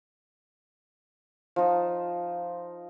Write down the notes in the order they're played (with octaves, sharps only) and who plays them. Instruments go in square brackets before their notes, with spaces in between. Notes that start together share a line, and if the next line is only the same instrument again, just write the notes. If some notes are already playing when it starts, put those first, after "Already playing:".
[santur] F3 D#4